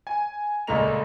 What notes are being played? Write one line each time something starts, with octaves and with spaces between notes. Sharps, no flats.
G#5
C#2 A#2 G#3 A3 A#5 F7